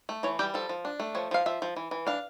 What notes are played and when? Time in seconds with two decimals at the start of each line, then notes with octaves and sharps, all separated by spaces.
0.09 A3
0.23 E3 C#5
0.39 G3 G4
0.54 F3 A4
0.69 F3
0.85 D4
1.00 A3
1.15 F3 C#5
1.31 F3 F5
1.46 F3 E5
1.62 F3
1.76 E3
1.91 E3
2.07 D4 F5